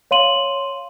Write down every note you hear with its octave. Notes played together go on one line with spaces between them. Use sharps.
C#5 F5 C6 D#7 F#7